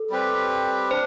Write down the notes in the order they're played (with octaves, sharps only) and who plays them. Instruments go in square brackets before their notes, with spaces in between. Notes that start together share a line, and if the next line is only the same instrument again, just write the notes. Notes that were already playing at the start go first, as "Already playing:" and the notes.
Already playing: [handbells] A4
[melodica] G3 C4 G4 B4
[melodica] D4 [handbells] C5